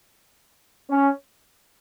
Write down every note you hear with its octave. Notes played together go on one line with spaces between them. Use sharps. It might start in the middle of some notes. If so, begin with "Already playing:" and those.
C#4